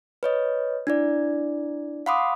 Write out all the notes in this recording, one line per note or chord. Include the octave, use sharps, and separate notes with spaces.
B4 C#5 D#5
D4 E4 D5
F5 F#5 B5 C6 D6 D#6